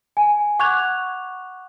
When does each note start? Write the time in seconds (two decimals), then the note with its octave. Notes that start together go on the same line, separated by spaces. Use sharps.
0.17 G#5
0.59 F#5 C#6 D6 F#6 G#6 F7